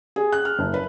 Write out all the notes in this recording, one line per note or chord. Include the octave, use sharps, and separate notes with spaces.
G#4
F#6
F6
F#1
B4